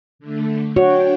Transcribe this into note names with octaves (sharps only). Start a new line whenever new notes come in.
D3 A3
D4 F#4 C#5 G5